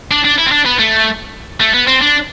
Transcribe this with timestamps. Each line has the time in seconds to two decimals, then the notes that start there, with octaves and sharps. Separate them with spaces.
0.11 D4
0.24 D4
0.38 E4
0.46 C4
0.52 D4
0.65 B3
0.79 A3
1.61 A3
1.74 B3
1.88 C4
2.02 D4